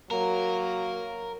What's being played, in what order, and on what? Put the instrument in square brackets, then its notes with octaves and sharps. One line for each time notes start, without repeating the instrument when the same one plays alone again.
[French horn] F#3 [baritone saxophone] A#3 [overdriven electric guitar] A#4